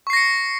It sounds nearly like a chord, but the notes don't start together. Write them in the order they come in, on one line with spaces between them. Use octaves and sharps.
C#6 C7 A#6 C#7